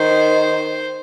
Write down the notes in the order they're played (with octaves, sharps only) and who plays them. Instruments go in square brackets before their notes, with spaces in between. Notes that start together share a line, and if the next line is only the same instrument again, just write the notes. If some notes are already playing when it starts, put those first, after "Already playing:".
Already playing: [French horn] D#3 [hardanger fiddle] C5